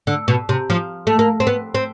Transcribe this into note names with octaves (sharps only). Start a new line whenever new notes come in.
D3
B2
C3
F3
A3
A#3
C4
B3
C4